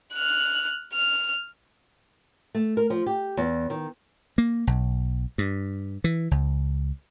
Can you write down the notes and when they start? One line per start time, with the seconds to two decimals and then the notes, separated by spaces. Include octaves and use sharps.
0.14 F6 F#6
0.94 F6
2.55 A3
2.77 A#4
2.90 F3
3.06 G4
3.37 E2
3.70 D#3
4.38 A#3
4.67 B1
5.38 G2
6.04 E3
6.31 C#2